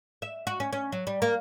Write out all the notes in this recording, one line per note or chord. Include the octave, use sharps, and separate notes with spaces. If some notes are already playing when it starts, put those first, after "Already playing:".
E5
F#4
C#4
C#4
F#3
G3
A#3